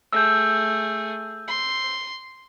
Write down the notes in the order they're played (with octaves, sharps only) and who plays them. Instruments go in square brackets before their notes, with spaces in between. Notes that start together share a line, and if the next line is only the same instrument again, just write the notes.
[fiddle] A3 G#4 [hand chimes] E6 G6
[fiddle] C6